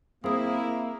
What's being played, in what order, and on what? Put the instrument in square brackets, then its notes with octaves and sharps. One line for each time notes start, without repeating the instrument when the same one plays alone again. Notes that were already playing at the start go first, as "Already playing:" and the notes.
[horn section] A#3 [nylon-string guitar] C4 [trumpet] E4 [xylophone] G#4 D#6